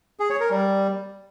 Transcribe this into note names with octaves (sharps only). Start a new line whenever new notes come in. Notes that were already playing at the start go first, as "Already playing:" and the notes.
G#4
C#5
A#4
G3